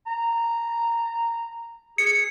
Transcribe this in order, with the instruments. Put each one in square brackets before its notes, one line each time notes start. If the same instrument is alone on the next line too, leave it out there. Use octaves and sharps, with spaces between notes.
[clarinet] A#5
[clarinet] G#4 [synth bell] C#7